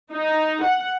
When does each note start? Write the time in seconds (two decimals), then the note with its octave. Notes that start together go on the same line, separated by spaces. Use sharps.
0.13 D#4
0.64 F#5